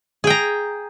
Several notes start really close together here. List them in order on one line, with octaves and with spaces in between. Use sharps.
G#4 G5 A#5